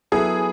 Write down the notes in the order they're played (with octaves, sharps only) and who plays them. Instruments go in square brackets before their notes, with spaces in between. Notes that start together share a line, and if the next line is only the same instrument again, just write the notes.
[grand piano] F#3 B3 E4 A4 [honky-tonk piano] G#4